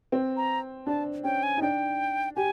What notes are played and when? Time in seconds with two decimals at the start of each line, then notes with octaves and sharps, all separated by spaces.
0.12 C4
0.37 A#5
0.87 D4 A5
1.24 C#4 G5
1.43 G#5
1.57 D#4
1.62 D4 G5
2.36 G4 G#5